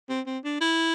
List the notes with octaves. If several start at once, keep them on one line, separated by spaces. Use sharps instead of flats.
C4
C4
D4
E4